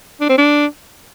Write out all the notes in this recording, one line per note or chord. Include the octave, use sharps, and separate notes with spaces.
D4
C4
D4